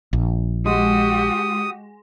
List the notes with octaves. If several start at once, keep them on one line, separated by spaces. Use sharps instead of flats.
A#1
G#3 F#4 G4 D#6